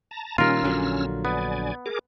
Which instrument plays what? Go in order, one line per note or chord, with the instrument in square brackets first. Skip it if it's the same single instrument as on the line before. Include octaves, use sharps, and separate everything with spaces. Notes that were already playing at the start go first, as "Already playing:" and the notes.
[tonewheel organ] A5 A#5
[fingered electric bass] A#2 D#3 G3 [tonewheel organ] C#4 E6 F6 [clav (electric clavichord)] F4 A#4
[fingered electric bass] A#1 D3 F#3
[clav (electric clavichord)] B3 [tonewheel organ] D5 G#5
[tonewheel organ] G#4 A#4 D6